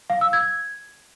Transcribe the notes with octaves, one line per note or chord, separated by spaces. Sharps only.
F5
E6
G#6